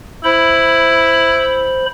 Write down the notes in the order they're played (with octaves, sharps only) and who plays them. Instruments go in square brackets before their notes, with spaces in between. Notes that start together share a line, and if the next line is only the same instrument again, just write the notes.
[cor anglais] E4 [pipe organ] C5 B5